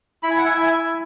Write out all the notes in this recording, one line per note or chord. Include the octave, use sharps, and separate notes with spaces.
E4 B5
G#5
F#5
E4 E5 G#5
E5 G#5
E4